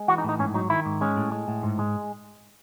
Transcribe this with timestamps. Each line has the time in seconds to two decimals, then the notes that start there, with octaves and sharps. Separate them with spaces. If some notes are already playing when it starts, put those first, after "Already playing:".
Already playing: G#3
0.08 E3 F#4
0.18 D#4
0.24 A2
0.29 D#4
0.39 G#2 C#4
0.54 F#3 D#4
0.70 D#3 E4
0.86 G#2
1.01 G#3 C#4
1.17 A2
1.32 G#3
1.48 A2
1.63 G#2
1.79 G#3